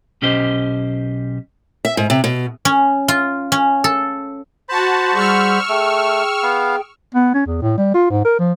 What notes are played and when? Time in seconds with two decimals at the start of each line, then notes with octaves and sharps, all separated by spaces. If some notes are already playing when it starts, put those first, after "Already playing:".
0.22 B1 C#4 G4 C5 D#5
1.85 E5
1.97 G#2
2.10 C3
2.24 B2
2.65 C#4
3.08 F4
3.52 C#4
3.84 A4
4.69 F#4 C5 A5 B5
5.14 G3 G#4 F#5 C#6 E6 F6
5.69 A3 G#4 G5
6.43 B3 F5
7.15 B3
7.34 C#4
7.46 E2
7.62 A2
7.78 G3
7.94 F4
8.10 G#2
8.24 A#4
8.39 F3